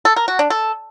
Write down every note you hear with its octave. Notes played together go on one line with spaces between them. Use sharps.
A4
A#4
F#4
D4
A4